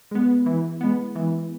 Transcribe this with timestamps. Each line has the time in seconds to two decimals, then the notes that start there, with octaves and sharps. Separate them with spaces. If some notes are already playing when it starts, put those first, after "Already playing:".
0.11 G#3 B3
0.46 E3
0.81 G#3 B3
1.16 E3